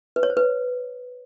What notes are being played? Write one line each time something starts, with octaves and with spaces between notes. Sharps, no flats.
B4
C#5
C5
B4